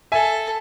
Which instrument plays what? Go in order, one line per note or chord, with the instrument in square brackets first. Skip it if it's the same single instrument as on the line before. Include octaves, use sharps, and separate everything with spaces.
[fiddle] A4 [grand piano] E5 G#5